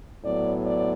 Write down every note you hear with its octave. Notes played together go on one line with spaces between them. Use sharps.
A2 F#3 B3 D5
D5